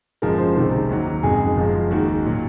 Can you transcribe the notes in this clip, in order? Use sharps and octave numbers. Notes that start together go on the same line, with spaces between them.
F#1 F#2 F3 G#3 A#4
C5
C2 C3 D#3 G#3
D#2 D#3 F#3
F#1 F2 D#3 G#3 G#4
F#1 F#2 F3 G#3
D#2 D#3 G#3 F#4
A#2 F#3